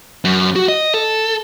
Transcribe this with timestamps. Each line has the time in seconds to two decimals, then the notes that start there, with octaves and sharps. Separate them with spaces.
0.25 F#2
0.56 F#4
0.68 D#5
0.94 A4